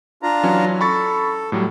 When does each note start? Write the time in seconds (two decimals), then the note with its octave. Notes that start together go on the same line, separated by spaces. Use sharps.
0.23 D4 F4 A#5
0.43 E3 F#3 C#4
0.81 A4 B5 C#6 A6
1.52 A2 F#3 G3